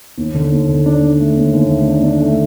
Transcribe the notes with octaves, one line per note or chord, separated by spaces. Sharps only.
D#2
D3
D#2
D3
D4
D4
A3
D#2
D#2
A3
D4
D4
A3